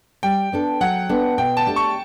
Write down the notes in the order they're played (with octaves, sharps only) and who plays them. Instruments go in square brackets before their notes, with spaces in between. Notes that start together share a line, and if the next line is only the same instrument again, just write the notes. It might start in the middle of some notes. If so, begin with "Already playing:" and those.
[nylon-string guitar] G3 [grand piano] G5
[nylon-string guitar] B3 D4 A4
[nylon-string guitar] F#3 [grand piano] F#5
[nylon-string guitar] B3 D4 A4
[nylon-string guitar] B2 [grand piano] G5
[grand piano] A5
[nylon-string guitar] A3 D4 G4
[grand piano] C#6